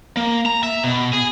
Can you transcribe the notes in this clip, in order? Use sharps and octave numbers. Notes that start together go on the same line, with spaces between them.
A#3
A#5
E5
B2
G#4